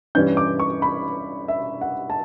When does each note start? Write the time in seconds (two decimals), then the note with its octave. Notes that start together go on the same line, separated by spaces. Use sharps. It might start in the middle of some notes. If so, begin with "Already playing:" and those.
0.15 G2 E3 G3 C#4 G6
0.37 D6
0.60 C#6
0.82 B5
1.48 E5
1.81 F#5
2.10 A5